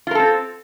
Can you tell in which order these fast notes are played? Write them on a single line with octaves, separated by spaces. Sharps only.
F4 A#4 A4 C4